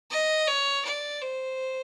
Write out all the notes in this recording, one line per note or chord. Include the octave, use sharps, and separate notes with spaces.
D#5
C#5
D5
C5